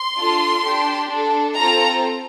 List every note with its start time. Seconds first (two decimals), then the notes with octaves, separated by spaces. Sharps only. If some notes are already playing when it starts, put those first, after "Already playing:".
Already playing: C6
0.18 D4 F4 A4
0.64 D4 G4
1.11 D4 A4
1.57 C4 F4 A4 A#5